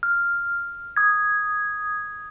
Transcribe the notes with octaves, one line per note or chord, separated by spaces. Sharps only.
F6
D#6 G#6